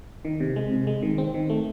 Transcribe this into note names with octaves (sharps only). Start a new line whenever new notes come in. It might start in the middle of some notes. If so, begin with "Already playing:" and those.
D#3
C3
G#3
C3
G#3
D#3
C4
D#3
A3